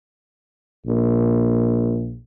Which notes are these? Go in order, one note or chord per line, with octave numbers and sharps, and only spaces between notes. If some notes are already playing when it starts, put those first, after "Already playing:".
A#1